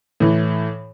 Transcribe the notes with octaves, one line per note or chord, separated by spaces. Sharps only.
A2 E3